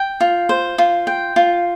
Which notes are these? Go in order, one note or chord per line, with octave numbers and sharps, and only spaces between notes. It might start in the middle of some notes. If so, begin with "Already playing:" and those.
Already playing: G5
F4
C5
F4
G5
F4